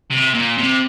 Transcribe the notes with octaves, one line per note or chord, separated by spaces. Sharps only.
C3
A#2
C3